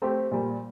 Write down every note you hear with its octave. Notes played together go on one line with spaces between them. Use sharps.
A3 C4 G4
A#2 G3 A#3